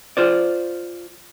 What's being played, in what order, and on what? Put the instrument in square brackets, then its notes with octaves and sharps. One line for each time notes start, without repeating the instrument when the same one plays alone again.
[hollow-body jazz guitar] F4 C5 D5